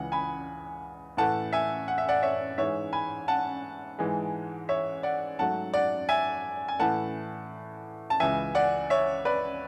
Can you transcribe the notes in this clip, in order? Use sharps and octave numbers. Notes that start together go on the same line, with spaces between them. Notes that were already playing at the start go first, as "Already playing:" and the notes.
Already playing: C#2 C#3 E3 F#5
G#5 B5
A2 E3 A3 F#5 A5
E5 G#5
F#5
E5
D5 F#5
C#5 E5
G#2 E3 G#3 C#5 E5
G#5 B5
F#5 A5
G#2 E3 G#3
C#5 E5
D5 F#5
G#2 F#3 A3 F#5 A5
D5 F#5
E5 G#5
G#5
A2 E3 A3 F#5 A5
A5
C#2 C#3 E3 E5 G#5
D5 F#5
C#5 E5
B4 D5